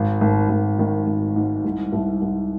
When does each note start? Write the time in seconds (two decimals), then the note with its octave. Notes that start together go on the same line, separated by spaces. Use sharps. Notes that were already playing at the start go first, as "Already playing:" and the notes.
Already playing: G#1
0.21 G#1
0.49 G#1
0.79 D#3
1.07 G#1
1.36 G#2
1.64 C2
1.92 C2
2.22 C2